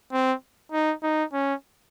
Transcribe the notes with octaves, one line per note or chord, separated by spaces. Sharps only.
C4
D#4
D#4
C#4